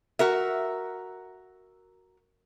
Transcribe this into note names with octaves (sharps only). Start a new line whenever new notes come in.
F#4 A#4 E5